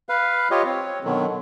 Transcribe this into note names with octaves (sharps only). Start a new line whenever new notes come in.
B4 F5
F4 G4 C#5 D#5
C4 C#5
B2 D3 D#3 F#3